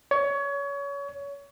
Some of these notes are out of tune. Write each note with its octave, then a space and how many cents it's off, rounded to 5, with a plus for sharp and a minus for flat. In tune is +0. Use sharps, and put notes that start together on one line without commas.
C#5 +25